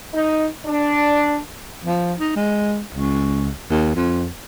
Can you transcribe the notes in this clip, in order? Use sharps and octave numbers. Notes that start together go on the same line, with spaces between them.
D#4
D4
F3
D#4
G#3
C#2
D#2
F2